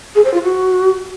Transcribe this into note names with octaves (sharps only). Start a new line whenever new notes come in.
G#4
C5
F4
F#4